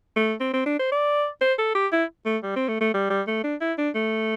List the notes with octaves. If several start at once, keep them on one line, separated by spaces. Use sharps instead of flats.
A3
C4
C4
D4
C5
D5
C5
A4
G4
E4
A3
G3
C4
A3
A3
G3
G3
A3
D4
E4
D4
A3